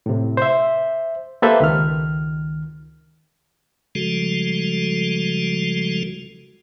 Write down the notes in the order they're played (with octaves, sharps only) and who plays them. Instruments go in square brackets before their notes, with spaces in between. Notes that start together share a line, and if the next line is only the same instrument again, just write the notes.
[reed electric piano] A2 C3
C5 E5
A#3 G4 A4 B4 C5 E5
C#2 D#3 F6
[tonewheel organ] C#3 F3 G3 G#3 F#4 A4